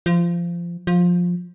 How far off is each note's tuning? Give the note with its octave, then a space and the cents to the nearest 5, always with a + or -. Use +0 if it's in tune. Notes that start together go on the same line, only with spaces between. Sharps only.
F3 -20
F3 +15